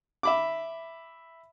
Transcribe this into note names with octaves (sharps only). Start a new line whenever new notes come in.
E5 B5 D6